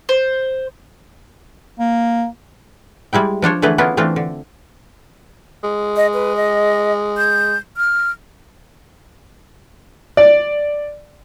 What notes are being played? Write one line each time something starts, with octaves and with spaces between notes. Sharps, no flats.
C5
A#3
G3 G#3 E4 G5
F3 D4 C5 C#5
D3 E3 A3 G#4 B4
B3 C#4 D4 E4 F4
E3 A3 C4 D4 F4
D3
G#3
D#5
B4
D#5
G6
F6
D5